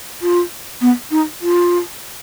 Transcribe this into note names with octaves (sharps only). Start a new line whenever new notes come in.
F4
B3
D#4
F4